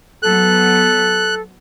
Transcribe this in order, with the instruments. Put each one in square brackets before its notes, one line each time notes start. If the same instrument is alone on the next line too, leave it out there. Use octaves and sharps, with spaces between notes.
[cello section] F#3 B3 [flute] A4 [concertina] F#6